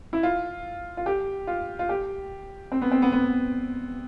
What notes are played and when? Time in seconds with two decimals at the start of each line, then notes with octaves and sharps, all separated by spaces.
0.13 E4
0.23 F4
0.97 F4
1.06 G4
1.47 F4
1.79 F4
1.89 G4
2.72 C4
2.82 B3
2.92 C4
3.02 B3
3.12 B3